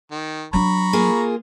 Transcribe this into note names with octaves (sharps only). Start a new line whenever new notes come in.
D#3
F#3 D4 A#5 B5 C#6
A#3 F4 G#4